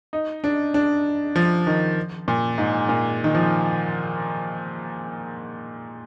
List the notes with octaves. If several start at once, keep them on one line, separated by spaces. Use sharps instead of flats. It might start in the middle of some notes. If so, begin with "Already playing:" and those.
D#4
D4
D4
F3
D#3
A#2
G#2
A#2
D#3
F3